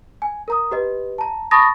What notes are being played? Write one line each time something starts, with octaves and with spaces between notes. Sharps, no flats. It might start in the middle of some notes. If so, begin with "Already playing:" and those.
G#5
A#4 A#5 D#6
G4 B4 D#5
A5 A#5
A5 B5 C#6 D#6 A6 A#6